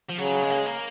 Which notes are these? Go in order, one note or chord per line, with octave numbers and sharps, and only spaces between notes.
F3
C#3 F#3
G#3
A#3
G#3
A#3